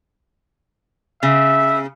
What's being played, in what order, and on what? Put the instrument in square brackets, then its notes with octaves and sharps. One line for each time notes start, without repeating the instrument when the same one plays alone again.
[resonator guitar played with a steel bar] C#3 [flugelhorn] E5